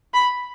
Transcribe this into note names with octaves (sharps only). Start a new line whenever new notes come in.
B5